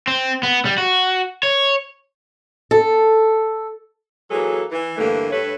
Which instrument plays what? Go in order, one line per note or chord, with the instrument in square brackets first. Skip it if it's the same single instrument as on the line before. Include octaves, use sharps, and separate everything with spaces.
[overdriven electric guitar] C4
B3
G3
F#4
C#5
[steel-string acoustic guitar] A4
[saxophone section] E3 F#3 A#3 G#4 A4
E3
G2 D3 E3 A3 A#3
G2 A3 B4 C#5